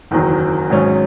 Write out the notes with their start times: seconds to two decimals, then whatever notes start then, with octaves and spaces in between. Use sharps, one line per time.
0.11 F#1 E2 D#3 F#3
0.70 G#1 G#2 F#3 C#4